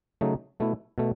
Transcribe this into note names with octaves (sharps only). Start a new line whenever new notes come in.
C#3 F#3 A3 D#4
B2 A3 E4
B2 A3